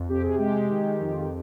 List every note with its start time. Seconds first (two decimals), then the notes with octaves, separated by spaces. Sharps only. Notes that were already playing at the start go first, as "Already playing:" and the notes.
Already playing: F2
0.09 C3 G4
0.22 G#4
0.35 G#3 G4
0.69 D#3
1.00 F2 D#4
1.11 F4
1.21 G4